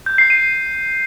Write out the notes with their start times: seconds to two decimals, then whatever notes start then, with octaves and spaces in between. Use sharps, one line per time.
0.06 G6
0.18 C7
0.30 D#7